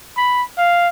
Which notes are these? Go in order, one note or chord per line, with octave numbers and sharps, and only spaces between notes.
B5
F5